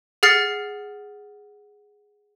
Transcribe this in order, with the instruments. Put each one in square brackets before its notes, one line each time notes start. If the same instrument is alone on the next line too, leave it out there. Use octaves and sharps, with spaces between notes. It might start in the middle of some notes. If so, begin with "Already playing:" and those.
[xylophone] G#4 F#5 F6 A6 C7